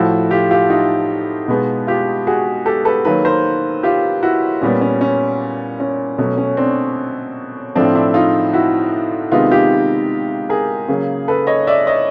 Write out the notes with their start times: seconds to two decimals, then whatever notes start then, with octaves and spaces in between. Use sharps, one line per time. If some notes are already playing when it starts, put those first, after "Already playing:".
Already playing: A2 F3 A3 E4 F#4
0.31 F4 G4
0.51 F4 G4
0.70 D#4 F4
1.48 B2 G#3 B3
1.87 F4 G4
2.27 F#4 G#4
2.66 G4 A4
2.85 A4 B4
3.05 D#3 F#3 A#3 A4 B4
3.25 A#4 C5
3.83 F4 G4
4.23 E4 F#4
4.61 A#2 G3 B3 C#4
4.81 C#4
5.01 C#4
5.80 C#4
6.18 B2 F#3 A3 C#4
6.38 C#4
6.57 C4 D4
7.75 A2 F3 A3 C4 D4
7.95 D4 E4
8.14 D#4 F4
8.53 E4 F#4
9.32 C3 D#3 G#3 B3 D#4 F4
9.51 F4 G4
10.49 G#4 A#4
10.89 C#3 F#3 A#3
11.28 A4 B4
11.47 C#5 D#5
11.67 D5 E5
11.87 C#5 D#5